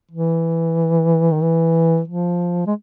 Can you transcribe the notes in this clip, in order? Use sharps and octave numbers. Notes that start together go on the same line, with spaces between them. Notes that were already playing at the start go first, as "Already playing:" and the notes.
E3
D#3
E3
F3
G#3